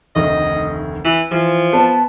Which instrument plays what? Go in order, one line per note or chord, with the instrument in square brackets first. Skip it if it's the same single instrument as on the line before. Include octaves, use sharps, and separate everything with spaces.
[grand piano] F1 D2 D#3 [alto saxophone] D#5
[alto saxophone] E3
[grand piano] E3 [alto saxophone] F3
[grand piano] B3 [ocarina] A5